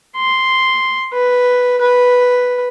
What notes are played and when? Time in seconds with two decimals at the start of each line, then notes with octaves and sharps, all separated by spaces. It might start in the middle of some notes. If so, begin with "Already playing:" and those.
0.16 C6
1.14 B4
1.81 B4